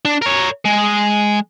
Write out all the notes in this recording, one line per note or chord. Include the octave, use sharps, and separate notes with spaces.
D4
A#4 C#5
G#3